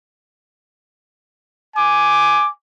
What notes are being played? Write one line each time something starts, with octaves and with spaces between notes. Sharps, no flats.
G#5 D6